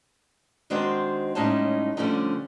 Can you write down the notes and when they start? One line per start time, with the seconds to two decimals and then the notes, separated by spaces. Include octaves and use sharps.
0.70 D#3 G#3 C4 D4 F#4 C5
1.35 A2 G3 G#3 C#4 D#4 A5
1.97 D3 F3 G3 A3 C#4 D#4